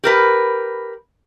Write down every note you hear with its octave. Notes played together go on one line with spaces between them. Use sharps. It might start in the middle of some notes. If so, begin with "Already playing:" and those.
G4 A#4 B4